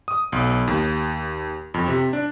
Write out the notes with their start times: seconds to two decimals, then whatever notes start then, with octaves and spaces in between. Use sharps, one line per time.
0.08 D#6
0.32 B1
0.68 D#2
1.74 F2
1.88 C3
2.13 D4